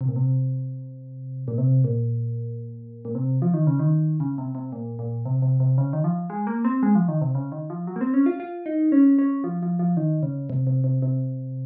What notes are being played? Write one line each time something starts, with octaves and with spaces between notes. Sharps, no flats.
C3
A#2
C3
A#2
C3
A#2
A#2
C3
F3
D#3
C#3
D#3
C#3
C3
C3
A#2
A#2
C3
C3
C3
C#3
D#3
F3
G#3
A#3
C4
G#3
F3
D#3
C3
C#3
D#3
F3
F#3
A#3
C4
C#4
F4
F4
D#4
C#4
C#4
F3
F3
F3
D#3
C#3
C3
C3
C3
C3